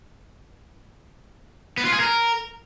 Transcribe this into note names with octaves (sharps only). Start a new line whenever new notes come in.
B3
F4
G#4
A#4